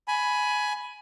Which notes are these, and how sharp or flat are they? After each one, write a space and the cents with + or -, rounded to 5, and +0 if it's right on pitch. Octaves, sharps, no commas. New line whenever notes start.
G#5 +15 B5 +0